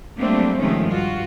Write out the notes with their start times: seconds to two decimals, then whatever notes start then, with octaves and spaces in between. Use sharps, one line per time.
0.18 F#3 G3 A3 A#3 C4 D4
0.58 C3 D#3 F3 G#3 A3 C#4
0.87 G2 F4 F#4